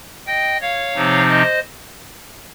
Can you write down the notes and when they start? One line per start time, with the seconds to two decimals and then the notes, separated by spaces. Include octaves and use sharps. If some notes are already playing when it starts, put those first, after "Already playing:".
0.27 D#5 G5
0.61 C#5 F5
0.95 C3 F3 C4 D#4
1.28 C5 D#5